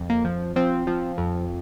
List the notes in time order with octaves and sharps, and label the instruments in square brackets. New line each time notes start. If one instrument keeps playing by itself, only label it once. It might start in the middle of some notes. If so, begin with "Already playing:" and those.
Already playing: [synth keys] F2
A#3
F3
F3 C4
F3
F2